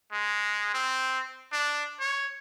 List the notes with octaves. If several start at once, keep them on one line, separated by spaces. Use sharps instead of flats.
G#3
C4
D4
C#5